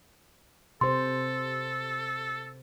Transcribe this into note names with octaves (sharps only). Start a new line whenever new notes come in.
C3 A4 C5 C6